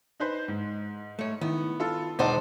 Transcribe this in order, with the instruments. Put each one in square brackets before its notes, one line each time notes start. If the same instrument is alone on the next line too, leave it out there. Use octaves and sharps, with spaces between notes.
[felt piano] D#4 B4 C5
G#2
[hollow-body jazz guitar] A3 C#5
[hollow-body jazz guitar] D#3 E4 [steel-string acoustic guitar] B3
[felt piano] F4 A4
[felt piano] E1 F#5 A5 [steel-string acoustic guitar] D#4 C5 D5